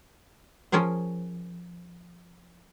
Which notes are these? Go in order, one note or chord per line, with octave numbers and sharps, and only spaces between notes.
F3 C#4 G#4 A#4 C5